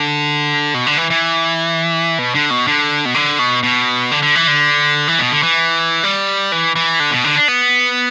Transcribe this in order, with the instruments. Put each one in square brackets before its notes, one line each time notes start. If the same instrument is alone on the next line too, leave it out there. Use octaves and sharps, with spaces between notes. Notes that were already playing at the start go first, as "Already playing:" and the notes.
Already playing: [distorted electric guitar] D3
B2
D3
E3
E3
B2
D3
B2
D3
B2
D3
B2
B2
D3
D3
E3
D3
E3
B2
D3
E3
G3
E3
E3
D3
B2
D3
D4
B3